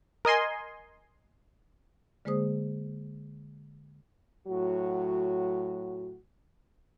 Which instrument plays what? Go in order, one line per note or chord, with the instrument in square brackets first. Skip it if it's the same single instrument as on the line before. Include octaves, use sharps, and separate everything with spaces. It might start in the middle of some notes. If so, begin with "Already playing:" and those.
[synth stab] A#4 D#5 G#5 C6
[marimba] D3 G#3 A#3 G#4 C5 D#6
[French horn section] A2 F#3 F#4